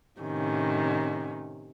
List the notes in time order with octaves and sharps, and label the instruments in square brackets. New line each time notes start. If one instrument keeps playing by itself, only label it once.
[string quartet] A2 C3 D#3 C#4